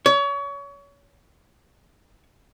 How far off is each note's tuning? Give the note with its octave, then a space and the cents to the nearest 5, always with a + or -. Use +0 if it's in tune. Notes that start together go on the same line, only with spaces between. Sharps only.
C#5 +30